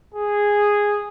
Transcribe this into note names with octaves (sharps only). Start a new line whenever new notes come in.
G#4